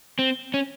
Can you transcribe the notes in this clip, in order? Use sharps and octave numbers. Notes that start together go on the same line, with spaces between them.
C4
C#4